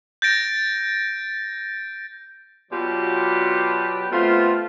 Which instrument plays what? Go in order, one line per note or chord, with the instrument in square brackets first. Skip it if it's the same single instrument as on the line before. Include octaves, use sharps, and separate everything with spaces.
[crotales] G6 A6 A#6 D7
[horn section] B2 F#3 F4 G4 B4 D5
A3 B3 C4 F4